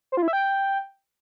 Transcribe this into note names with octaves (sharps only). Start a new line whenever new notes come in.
C5
F4
E4
E5
G5